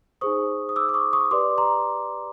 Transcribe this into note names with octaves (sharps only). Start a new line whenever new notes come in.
D#4 G#4 C5 C#6 D#6
D#6
D6 E6
D6
C#6 D#6
C#6 D#6
G4 B4 D5 C6 D6
A#5 C6